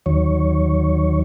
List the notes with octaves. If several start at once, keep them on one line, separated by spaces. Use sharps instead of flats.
D#2 D#3 F#3 C#5